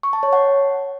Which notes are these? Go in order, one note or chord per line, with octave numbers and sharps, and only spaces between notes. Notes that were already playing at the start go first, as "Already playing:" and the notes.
C#6
A5
C#5
F#5